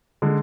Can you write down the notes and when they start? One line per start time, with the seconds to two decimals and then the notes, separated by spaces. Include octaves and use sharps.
0.22 D3 G#3